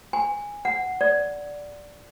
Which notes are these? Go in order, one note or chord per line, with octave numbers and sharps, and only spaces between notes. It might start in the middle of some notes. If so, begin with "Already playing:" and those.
G#5
F#5
D5